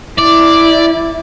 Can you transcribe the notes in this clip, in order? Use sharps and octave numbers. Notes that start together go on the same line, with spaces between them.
E4 D5